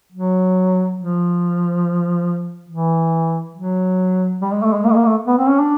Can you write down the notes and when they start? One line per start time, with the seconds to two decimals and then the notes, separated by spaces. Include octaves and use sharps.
0.12 F#3
0.98 F3
2.69 E3
3.55 F#3
4.41 G3
4.52 G#3
4.63 A3
4.73 G#3
4.84 A#3
4.90 A3
4.95 A#3
5.06 A3
5.27 B3
5.37 C4
5.48 C#4
5.59 D4